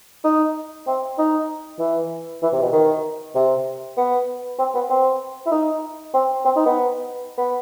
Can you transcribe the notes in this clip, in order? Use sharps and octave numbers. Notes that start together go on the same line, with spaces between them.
D#4
C4
D#4
E3
E3
C3
B2
D#3
C3
B3
C4
B3
C4
E4
D#4
C4
C4
D#4
B3
B3